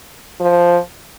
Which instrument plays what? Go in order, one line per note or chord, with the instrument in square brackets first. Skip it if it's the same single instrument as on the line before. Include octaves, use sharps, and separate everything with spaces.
[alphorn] F3